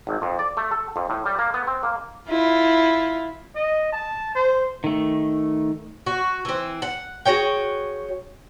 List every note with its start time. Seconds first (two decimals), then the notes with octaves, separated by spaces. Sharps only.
0.07 G#1
0.22 F2
0.39 D5
0.57 A3
0.71 A4
0.96 F2
1.10 A2
1.26 G3
1.39 A#3
1.54 B3
1.67 C4
1.83 A#3
2.28 E4 F4
3.56 D#5
3.93 A5
4.35 C5
4.84 D#3 A3
6.06 F#4
6.45 E3 C4
6.82 F#5
7.25 F#4 G#4 C#5 G5